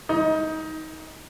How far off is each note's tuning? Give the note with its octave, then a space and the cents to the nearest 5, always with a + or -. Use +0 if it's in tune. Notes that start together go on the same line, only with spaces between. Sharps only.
D#4 +20